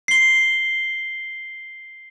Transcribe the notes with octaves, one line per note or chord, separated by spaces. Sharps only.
C7 G7